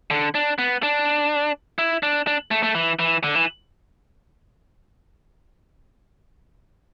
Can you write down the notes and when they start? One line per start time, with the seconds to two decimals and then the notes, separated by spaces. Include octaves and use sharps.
0.11 D3
0.35 D4
0.59 B3
0.83 D4
1.79 E4
2.03 D4
2.27 D4
2.51 A3
2.63 A3
2.75 E3
2.99 E3
3.24 D3
3.35 E3